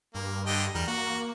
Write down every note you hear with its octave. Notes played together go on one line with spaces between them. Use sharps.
G2 A#3
D3 D#5 G5
E2 G3 A#4
A#3 F#4